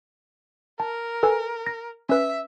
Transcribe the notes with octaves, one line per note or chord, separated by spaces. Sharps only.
A#4 A5
A4 B4 G#5
A#6
C#4 B4 E5